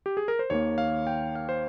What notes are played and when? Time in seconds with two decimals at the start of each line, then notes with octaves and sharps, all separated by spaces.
0.06 G4
0.17 G#4
0.28 A#4
0.39 C5
0.50 D#2 D#3 A#3 C#5
0.78 F5
1.07 G5
1.35 F5
1.49 C5